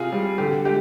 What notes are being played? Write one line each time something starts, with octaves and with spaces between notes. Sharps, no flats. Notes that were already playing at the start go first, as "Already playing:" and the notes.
Already playing: C3 F4 G#4
G3
D3 G4
G#3 G4